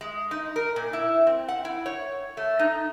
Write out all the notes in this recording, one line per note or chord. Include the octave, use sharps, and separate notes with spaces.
G#3
D#4
A#4
A#2
E4
C4
F#5
E4
C#5
A3
D#4